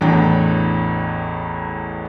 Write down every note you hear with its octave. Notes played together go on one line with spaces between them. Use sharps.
A1 E2 A2 D4 G5 A#5